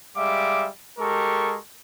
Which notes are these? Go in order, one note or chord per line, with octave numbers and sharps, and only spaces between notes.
G3 G#3 E5 F5 D6
G#3 G4 A4 A#4 C#6